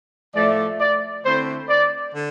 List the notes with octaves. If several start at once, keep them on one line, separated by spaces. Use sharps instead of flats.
A2 F3 A3 D5
D5
D3 A3 C4 E4 C5
D5
D3